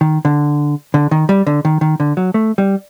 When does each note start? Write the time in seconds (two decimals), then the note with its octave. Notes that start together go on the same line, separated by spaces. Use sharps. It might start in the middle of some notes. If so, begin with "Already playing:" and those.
0.01 D#3
0.25 D3
0.94 D3
1.11 D#3
1.29 G3
1.47 D3
1.65 D#3
1.81 D#3
2.00 D3
2.17 F#3
2.34 A3
2.58 G3